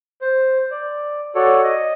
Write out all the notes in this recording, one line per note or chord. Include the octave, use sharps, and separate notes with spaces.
C5
D5
F#4 A4 C#5 D5
D#5